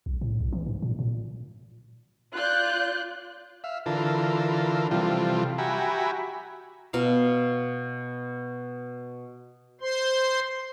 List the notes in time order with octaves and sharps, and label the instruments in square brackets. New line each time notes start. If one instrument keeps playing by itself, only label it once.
[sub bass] B1
A2
B1
E3
G#2
A#2
A#2
[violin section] F4 D5 F#6 G6
[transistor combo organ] E5 F5
D3 E3 F4 A4 A#4
C3 E3 F3 G3 F4 A4
F#4 G4 E5 G#5 A#5 B5
[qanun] B2 F5
[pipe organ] C5 C6